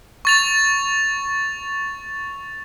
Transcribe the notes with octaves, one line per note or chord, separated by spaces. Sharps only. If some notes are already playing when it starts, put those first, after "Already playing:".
C#6 A6 F7